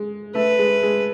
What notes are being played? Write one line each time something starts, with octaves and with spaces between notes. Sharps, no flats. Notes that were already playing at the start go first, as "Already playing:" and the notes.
Already playing: G#3
A3 B4
G#3
G#3